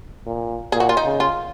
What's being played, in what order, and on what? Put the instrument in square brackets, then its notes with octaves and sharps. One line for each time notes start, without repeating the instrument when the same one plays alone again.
[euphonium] A#2
[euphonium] A#2 [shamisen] G#4
[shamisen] F#4
F4
D#4
[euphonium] C#3
[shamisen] F4